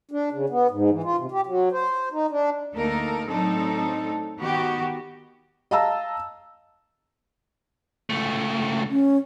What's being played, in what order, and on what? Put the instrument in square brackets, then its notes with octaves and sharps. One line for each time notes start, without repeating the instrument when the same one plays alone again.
[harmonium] D4
C#3
B3
G#2
E3
F4
C3
G4
F#3
C5
D#4
D4
[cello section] D2 A#3 D#4 A4 A#4
A2 F#3 C4 D4 D#4 A4
D#3 B3 F#4 G4
[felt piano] D#5 F5 A5 A#5 E6
[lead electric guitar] C#2 A3
[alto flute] C#4